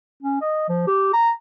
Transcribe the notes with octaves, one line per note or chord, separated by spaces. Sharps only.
C#4
D#5
F3
G4
A#5